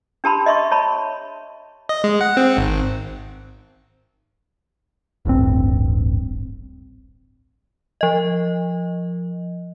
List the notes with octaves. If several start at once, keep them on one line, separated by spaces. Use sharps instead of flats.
D4 G4 A5 B5 C6
D#5 E5 C6 C#6
C#5 A5 B5
D#5
G#3
F#5
C4
G#1
D1 A1 G2 C4
F3 D#5